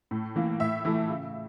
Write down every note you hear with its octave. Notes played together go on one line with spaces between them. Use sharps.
A2
E3 A#3
A2 E5
E3 A3
C#3